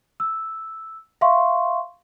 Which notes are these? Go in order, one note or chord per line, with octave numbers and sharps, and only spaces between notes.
E6
E5 F5 C6 C#6